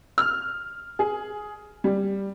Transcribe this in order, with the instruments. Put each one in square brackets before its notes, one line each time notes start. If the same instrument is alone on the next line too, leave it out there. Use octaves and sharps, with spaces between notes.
[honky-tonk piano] F6
G#4
G3